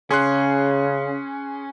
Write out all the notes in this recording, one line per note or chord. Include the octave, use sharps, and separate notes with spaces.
C#3 C#4 G#4 C6 F#6